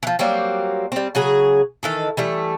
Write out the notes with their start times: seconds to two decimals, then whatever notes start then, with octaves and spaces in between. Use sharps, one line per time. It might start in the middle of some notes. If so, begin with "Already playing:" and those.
0.03 E3 F3
0.19 F#3 G3 A#3 C4
0.92 G3 C4
1.15 C#3 F#3 G#4
1.83 D#3 E3 A4
2.17 E3 G3 A3